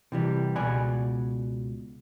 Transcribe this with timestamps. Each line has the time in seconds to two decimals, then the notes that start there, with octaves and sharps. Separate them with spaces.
0.12 C3 E3 G3
0.56 C#2 B2 D5 F#5 G#5 B5